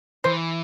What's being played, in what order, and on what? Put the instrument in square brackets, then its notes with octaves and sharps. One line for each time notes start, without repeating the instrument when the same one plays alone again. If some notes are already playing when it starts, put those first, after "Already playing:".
[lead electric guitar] E3 [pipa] C5